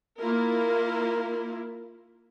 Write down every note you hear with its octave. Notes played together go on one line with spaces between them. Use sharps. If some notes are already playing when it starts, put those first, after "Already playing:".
A#3 E4 F4 A#4